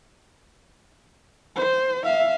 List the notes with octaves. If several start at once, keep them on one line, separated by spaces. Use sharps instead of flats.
C5
E5 F5